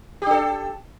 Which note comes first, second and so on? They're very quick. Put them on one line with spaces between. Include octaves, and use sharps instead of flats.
G4 D4 A4